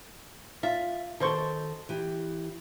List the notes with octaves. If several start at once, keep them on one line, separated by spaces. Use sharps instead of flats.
F4 E5
B2 D#3 A4 C5 C#6
E3 G4